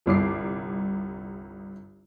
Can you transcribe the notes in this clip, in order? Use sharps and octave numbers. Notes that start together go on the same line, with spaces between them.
G1 C2 D6 C7